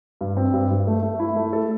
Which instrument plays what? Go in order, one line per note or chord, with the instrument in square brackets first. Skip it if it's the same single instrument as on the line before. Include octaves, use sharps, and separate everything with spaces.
[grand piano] G2
C4
G2
G2
A3
A3
E4
A3
A4